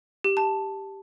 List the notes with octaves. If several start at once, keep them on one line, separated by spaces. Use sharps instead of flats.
G4
A5